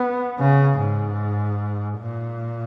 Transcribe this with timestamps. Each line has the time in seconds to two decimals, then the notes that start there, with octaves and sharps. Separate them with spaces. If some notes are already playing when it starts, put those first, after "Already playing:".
Already playing: B3
0.39 C#3
0.79 G#2
1.99 A#2